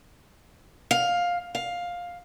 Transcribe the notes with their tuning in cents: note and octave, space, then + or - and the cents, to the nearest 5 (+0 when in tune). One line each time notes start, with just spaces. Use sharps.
F5 +10
F5 +10